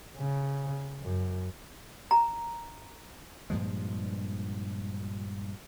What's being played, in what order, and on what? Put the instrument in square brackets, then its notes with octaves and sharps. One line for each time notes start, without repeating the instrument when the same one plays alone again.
[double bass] C#3
F#2
[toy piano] A#5
[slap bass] G2 A#2 F3 G#3